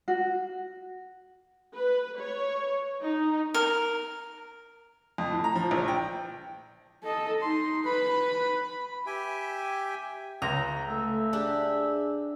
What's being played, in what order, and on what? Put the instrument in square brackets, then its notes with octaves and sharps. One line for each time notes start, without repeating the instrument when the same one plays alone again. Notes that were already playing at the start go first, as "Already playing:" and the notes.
[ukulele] F#4
[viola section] B4
C#5
D#4
[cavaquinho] A#4
[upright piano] F2
A2
A#5
F3
A#1
G5
[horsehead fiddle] A4 D#5
[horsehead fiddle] D#4 [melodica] C6
[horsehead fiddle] B4 [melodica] B5
[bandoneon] G4 E5 G5 G#5
[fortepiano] C#2 [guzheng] A#5
[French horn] A3 [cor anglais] E5
[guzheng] D4 G4 [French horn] G#4